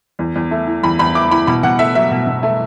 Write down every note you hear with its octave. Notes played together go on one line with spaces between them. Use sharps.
E2
E2
A3
E3
E2 B5
E2 B5
A3 D6
E3 B5
B2 B5
B2 F#5
A3 E5
F#3 E5
B2
B2
A3